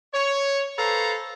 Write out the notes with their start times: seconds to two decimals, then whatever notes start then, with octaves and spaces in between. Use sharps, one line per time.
0.13 C#5
0.78 A4 B4 C5 F5 A#5